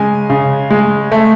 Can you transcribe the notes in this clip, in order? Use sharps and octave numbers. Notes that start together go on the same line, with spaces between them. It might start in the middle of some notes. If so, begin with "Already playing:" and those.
Already playing: C#3 G#3 G#5
C#3
G#3
A3